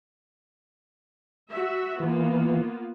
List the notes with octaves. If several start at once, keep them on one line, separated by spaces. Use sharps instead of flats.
F#4 E5
E3 A#3 B3 F4